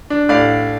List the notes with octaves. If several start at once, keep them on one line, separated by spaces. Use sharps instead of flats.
D4
A2 D5 F5